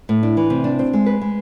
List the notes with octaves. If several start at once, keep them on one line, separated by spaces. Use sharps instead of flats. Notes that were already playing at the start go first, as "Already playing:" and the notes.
A2
D4
E3
C3
D4
C4
G#3
B4
G#3